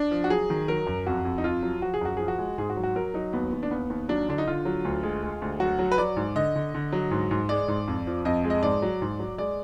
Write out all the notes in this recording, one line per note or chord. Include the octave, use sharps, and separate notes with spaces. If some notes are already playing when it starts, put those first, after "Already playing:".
Already playing: D4
F3
F#4
F#3 G#4
D#3
F#3 A#4
F#2
F2 F#4
F2
D#4
F2 F4
F#3
F3 F#4
G#4
F#2 F#4
F3 G#4
F#4
G#3
G#2 G#4
F#4
F#3
F#4
F#3 A#4
F#3 D#4
D#2 B3
D#2
D4
D#2 B3
D#2
F#3 D4
D3 D4
D#4
D3 F4
F#3
D2
G#3
G#3
D2
F#3 F#4
F#3
B4
F#3 D5
G#2
D3 D#5
D3
D3
F#3
G#2
G#2
G#3 D5
G#2
F2
F3
F2 D#5
G#3
D#5
G#2 D5
F#3
G#2
F#3
G#3 D5